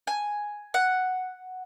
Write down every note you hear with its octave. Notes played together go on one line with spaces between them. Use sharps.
G#5
F#5